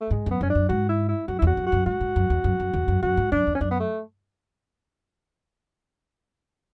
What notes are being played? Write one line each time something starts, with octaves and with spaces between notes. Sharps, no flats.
A3
G#2 G#3
F#2 B3
F#2 C#4
D4
F#2
G#2 F#4
E4
E4
F#2 F#4
E4
E2 F#4
F#2
F#4
F#2
G#2 F#4
G#2
F#2
E2
F#2
F#2
E2
F#2
F#2 F#4
G#2
F#2 D4
E2
C#4
F#2 D4
B3
A3